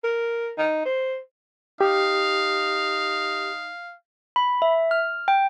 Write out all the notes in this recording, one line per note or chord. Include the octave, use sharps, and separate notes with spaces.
A#4
D#4
C5
D#4 G4 F5
B5
E5
F6
G5